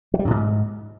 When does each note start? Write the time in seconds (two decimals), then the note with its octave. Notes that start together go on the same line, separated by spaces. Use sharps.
0.14 F#3
0.19 G3
0.25 F#2
0.30 A2
0.36 G#2